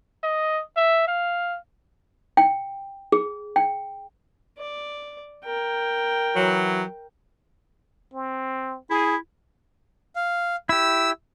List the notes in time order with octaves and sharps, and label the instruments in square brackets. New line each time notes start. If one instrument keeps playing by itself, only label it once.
[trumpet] D#5
E5
F5
[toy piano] G5
G#4
G5
[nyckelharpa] D5
A#4 G5
[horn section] E3 F#3
[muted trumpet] C4
[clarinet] E4 [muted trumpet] G#4
[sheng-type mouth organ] F5
[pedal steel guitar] E4 G4 [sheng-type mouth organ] E6